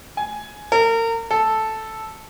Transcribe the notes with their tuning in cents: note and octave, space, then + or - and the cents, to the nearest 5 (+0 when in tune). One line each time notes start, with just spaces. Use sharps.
G#5 +10
A#4 -35
A4 -5